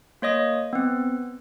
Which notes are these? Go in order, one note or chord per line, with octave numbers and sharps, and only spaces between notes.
A#3 C#5 D#5 D#6
B3 C4